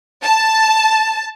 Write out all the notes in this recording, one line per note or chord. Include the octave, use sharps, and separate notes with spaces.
A5